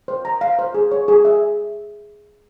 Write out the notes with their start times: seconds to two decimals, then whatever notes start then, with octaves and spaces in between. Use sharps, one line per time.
0.08 C5
0.25 A#5
0.41 F5
0.59 C5
0.74 G#4
0.91 C#5
1.08 G#4
1.25 E5